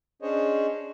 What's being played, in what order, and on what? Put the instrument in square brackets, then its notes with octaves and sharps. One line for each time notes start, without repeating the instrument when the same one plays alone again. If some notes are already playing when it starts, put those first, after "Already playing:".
[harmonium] C#4 D4 G#4 C5 C#5 D#5